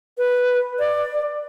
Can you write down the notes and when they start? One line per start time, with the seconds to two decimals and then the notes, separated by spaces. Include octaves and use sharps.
0.18 B4
0.79 D5